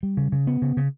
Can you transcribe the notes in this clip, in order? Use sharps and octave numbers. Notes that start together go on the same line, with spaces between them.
G3
C#3
C#3
B3
C#3
C#3